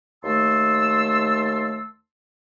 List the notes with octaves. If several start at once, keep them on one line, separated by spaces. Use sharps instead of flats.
D#2 A3 A5 C6 E6